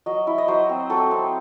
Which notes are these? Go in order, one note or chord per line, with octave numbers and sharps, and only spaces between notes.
F#3 D#5
E4
D#5
F#3 C5
C4
F#3 A4
C4